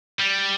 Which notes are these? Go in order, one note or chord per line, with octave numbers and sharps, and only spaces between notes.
G3